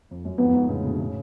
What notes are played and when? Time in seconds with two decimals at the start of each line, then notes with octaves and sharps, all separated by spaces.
0.11 F2
0.25 F#2
0.38 F2 G#2 B3
0.54 F2 G#2
0.69 A2 C#3
0.84 B2 D3
0.99 A2 C#3